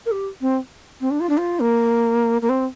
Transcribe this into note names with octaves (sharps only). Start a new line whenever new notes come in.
A#4
G4
C4
C4
D4
F4
D4
F4
A#3
A#3
C4